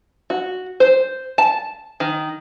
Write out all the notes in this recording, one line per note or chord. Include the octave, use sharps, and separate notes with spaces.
F#4
C5
A5
D#3